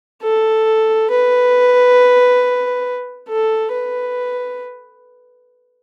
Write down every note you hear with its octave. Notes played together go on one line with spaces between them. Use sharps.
A4
B4
A4
B4